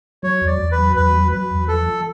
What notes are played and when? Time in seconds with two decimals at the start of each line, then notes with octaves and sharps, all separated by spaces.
0.23 F#3 C#5
0.41 E2
0.47 D5
0.59 E2
0.71 B4
0.78 F#3
0.95 E2 B4
1.14 F#3
1.32 F#3 B4
1.51 E2
1.68 F3 A4
1.86 F3